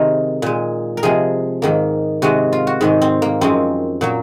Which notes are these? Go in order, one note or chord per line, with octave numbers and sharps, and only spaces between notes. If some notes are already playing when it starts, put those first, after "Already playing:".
Already playing: C3 D#3 G#3 A#4
A#2 G#3
A#4
C3 F3 G#3 G#4
G#2 D#3 A#3
C3 D#3 G#3 F#4
F4
F#4
G#2 D#3 G#3
C4
A#3
F#2 F3 G#3 C4
A#2 F#3 A#3